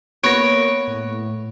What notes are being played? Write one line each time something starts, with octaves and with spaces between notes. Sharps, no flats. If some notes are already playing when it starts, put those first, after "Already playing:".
A#3 B3 B4 C#5 A#6 D7
A2